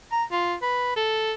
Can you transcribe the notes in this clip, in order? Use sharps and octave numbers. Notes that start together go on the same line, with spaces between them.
A#5
F4
B4
A4